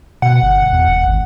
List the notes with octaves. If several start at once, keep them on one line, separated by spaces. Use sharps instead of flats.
B2 F#5
G1
E2
E1
G#1